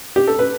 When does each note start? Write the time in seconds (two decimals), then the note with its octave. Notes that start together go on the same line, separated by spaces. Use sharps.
0.16 G4
0.27 A4
0.39 B4